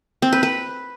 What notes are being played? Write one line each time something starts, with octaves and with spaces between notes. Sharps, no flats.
C4
B4
B4